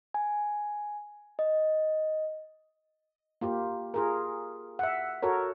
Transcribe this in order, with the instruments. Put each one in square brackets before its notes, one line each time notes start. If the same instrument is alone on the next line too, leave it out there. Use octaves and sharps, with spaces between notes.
[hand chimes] G#5
D#5
[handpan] A#3 F4 G4
F4 G#4 A#4
E5 F#5
F#4 A4 A#4 C#5